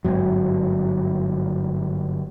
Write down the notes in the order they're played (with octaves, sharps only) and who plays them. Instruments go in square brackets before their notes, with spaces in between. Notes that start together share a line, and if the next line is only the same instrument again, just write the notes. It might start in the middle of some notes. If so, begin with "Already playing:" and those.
[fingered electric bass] G1 D#2 G#2 F#3